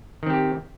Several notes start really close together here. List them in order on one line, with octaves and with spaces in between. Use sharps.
D#3 C4 G4